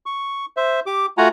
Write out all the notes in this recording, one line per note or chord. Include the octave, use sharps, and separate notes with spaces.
C#6
C5 E5
G4 D6
A3 F4 F#4 F#5 G#5 A#5